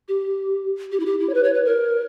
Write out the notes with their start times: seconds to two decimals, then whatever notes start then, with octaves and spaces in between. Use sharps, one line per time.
0.08 G4
0.92 G4
1.00 E4
1.06 G4
1.20 E4
1.29 C#5
1.34 B4
1.44 C#5
1.54 B4
1.65 A#4